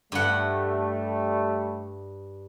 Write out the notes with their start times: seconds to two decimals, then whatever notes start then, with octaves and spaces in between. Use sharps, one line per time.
0.12 G2 G3 A3 F#5